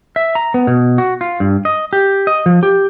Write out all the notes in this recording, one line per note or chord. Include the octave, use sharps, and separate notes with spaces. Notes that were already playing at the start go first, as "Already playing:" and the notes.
E5
A#5
B3
B2
F#4
F4
G2
D#5
G4
D#5
F3
G4